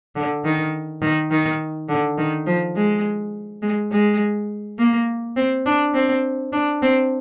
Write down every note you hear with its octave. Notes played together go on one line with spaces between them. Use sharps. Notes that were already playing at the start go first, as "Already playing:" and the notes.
D3
D#3
D#3
D#3
D3
D#3
F3
G#3
G#3
G#3
A#3
C4
D4
C4
D4
C4